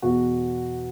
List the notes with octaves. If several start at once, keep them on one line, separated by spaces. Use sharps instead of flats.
E2 B2 F#4